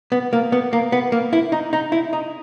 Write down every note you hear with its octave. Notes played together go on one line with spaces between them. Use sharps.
B3
A#3
B3
A#3
B3
A#3
E4
D#4
D#4
E4
D#4